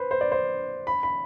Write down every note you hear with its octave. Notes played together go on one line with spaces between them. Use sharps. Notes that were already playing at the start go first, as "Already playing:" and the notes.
Already playing: B4 C5
C5
D5
C5
B5
B5